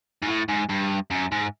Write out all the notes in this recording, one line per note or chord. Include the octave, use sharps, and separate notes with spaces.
G#2
A2
G#2
G2
F#2
G#2